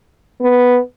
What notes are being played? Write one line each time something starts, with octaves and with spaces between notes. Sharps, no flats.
B3